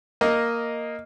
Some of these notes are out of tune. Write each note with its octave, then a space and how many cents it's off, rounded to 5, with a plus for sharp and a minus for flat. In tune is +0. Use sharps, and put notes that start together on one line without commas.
A#3 +0 D#5 +0